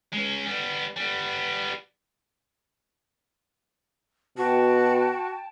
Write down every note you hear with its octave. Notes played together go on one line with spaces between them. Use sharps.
G#3 C#4
G3 B3
G3 B3
B2 F#4 G5 A5